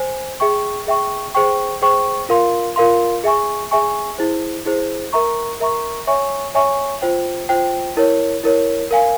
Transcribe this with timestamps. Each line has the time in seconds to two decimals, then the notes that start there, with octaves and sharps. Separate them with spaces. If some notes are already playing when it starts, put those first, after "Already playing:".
Already playing: C5 G#5
0.40 G#4 E5 G5 C#6
0.87 G#4 E5 G5 C#6
1.35 G#4 C5 G5 C#6
1.82 G#4 C5 G5 C#6
2.29 F4 A#4 F5 C6
2.76 F4 A#4 F5 C6
3.24 G#4 E5 G#5 C#6
3.71 G#4 E5 G#5 C#6
4.18 E4 G#4 C5
4.66 E4 G#4 C5
5.13 A#4 E5 A#5 C#6
5.60 A#4 E5 A#5 C#6
6.07 C#5 E5 G#5 C#6
6.55 C#5 E5 G#5 C#6
7.02 F4 C5 G5
7.49 F4 C5 G5
7.97 E4 A#4 C#5
8.44 E4 A#4 C#5
8.91 A#4 F5 G#5